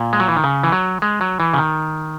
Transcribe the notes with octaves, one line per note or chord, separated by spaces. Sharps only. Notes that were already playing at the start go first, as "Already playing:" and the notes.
Already playing: A#2
G#3
F#3
E3
D#3
C#3
E3
F#3
G#3
F#3
E3
C#3
D#3